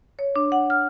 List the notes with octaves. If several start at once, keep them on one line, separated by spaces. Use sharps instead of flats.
C#5
D4
F#5
F6